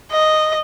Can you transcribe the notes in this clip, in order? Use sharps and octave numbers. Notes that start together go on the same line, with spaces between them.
D#5